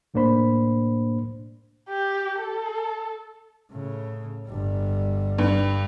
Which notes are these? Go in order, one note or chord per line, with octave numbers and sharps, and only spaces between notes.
C2 A2 A#3 D4 C5 B5
G4
A4
A2 C#3
G1 G3
G2